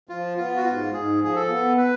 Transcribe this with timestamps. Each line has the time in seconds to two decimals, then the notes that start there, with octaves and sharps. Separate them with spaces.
0.09 F3 F4
0.37 B3 F4
0.57 F#4
0.65 G#2 F4
0.93 G#2 G#4
1.21 F3 G#4
1.35 A4
1.49 B3
1.78 B4